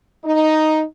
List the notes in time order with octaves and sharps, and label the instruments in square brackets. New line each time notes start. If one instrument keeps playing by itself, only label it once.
[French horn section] D#4